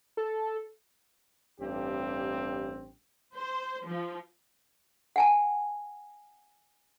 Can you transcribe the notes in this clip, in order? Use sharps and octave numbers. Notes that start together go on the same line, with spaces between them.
A4
A1 G2 C4 G4
C5
F3
F#5 G#5 A5